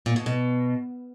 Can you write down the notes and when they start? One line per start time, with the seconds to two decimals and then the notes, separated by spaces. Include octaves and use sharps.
0.06 A#2
0.16 B2
0.26 B2